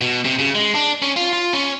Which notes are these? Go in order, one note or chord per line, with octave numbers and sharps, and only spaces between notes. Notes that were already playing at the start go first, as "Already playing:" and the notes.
B2
C3
C#3
G#3
D4
C#4
F4
F4
C#4